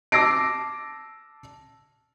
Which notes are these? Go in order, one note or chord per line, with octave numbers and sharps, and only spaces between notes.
A5 D6 E6 A#6 C7 D7